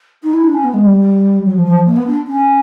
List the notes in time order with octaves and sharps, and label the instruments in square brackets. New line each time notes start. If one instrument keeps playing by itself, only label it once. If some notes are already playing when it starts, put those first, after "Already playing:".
[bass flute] D#4
E4
D4
C#4
B3
G#3
G3
F#3
F3
F3
A#3
B3
D4
C#4